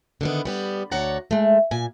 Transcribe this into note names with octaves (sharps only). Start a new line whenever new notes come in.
D3 D#3 B3
G3 B3 G4
D2 C#5 D5 F#5 A#5
G#3 A3
A#2 G#5